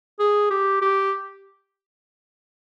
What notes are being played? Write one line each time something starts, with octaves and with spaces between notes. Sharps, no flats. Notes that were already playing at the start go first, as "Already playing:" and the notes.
G#4
G4
G4